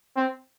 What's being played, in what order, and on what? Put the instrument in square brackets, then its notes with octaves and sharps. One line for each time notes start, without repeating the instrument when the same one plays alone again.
[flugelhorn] C4